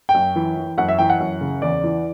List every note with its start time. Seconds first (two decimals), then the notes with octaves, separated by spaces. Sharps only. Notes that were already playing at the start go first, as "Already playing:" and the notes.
0.09 G5
0.14 F#2
0.36 E3
0.57 E3
0.78 F#2 F#5
0.88 E5
0.99 E3 G5
1.10 F#5
1.20 F#2
1.41 C#3
1.62 E2 D5
1.84 E3